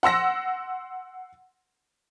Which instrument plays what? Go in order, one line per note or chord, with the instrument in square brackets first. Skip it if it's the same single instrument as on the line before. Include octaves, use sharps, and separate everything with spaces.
[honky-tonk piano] F#5 C6 E6 A#6